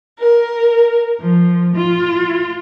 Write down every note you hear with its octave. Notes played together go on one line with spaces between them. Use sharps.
A#4
F3
F4